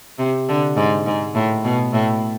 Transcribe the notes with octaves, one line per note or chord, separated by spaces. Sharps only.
C3
D3
G#2
G#2
A2
B2
A2